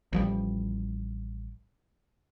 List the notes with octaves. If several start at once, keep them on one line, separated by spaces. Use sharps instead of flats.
A1 F3 G3